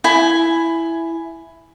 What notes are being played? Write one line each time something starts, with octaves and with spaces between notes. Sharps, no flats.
E4 G#5